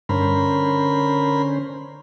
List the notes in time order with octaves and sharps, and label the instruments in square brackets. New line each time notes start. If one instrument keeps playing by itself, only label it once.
[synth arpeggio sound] G2 [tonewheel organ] D3 C#4 C5 [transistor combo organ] A#4 B5